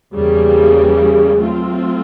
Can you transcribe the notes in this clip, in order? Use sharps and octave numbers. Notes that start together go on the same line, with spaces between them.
E2 C#3 E3 G3 A#3
F#3 A3 C4 F4